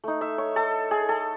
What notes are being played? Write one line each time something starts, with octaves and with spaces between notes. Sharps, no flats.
A3 D#4
E5
C#5
A4
G#4
A4